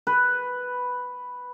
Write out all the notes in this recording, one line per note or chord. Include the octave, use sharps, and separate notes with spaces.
B4